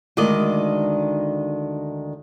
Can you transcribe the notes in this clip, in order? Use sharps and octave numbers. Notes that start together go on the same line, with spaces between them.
D2 D#3 G#3 D5 D#5